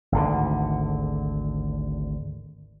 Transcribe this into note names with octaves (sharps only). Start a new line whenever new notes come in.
G#1 D2 D3